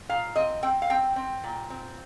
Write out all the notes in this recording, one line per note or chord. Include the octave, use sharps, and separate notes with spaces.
A#2 F5
C4 D#5
C4 G5
F5
C4 G5
C4
A#2
C4